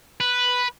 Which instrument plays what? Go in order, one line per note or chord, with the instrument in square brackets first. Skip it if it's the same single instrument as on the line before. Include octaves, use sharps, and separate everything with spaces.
[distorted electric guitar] B4